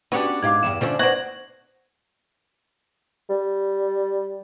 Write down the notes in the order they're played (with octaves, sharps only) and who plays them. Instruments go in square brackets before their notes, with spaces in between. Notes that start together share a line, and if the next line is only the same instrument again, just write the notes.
[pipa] B3 D4 [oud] C#4 F#4 G4
[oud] G#2 G4 F5 [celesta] D6 G#6
[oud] E2 G2 [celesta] E7
[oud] D3 C#4 D4 [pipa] F3 A3
[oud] B3 D4 [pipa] C5 F#5 [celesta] C#6 G#6 A#6
[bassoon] G3